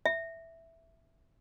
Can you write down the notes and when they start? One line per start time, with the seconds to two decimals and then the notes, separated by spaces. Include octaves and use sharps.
0.06 E5